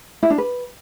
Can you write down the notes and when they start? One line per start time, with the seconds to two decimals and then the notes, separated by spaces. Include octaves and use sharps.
0.23 E4
0.30 D4
0.38 B4